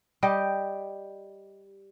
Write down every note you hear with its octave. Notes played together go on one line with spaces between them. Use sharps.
G3 G4 D#5